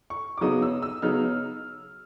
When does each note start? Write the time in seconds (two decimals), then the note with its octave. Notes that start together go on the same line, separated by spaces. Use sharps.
0.10 C#6
0.38 D6
0.41 C#3 F#3 B3 D#4 D#6
0.62 E6
0.82 E6
1.02 C#3 F#3 B3 D#4 F6